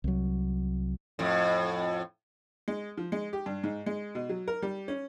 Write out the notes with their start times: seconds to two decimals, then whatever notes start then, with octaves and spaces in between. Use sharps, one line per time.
0.04 C2 F#3
1.19 F2 A2
2.68 G#3
2.97 F3
3.12 G#3
3.33 G4
3.46 G2
3.64 G#2
3.86 G#3
4.15 B2
4.29 F#3
4.47 A#4
4.62 G3
4.88 C#4